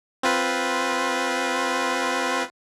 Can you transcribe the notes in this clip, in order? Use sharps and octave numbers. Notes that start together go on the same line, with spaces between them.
C4 F4 B4